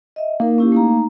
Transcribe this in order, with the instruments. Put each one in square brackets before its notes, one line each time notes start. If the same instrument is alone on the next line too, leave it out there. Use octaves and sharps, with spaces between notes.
[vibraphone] D#5 E5
[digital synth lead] A#3 [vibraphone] D#4 A#4
[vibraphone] C#4 E4 G4
A3 D#4 A#5